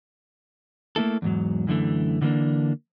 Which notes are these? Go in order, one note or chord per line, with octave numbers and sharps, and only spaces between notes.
A3 A#3 E4 A4
E2 G#2 F#3
F#2 D3 E3 A3
D3 E3 G3 A#3 D4